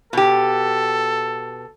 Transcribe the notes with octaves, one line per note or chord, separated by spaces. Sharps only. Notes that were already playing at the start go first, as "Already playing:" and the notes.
B2 G4 A4